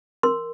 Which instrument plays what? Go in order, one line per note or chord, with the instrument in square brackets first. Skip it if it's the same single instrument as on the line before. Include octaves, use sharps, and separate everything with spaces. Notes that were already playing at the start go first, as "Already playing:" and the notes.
[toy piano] A#4 C6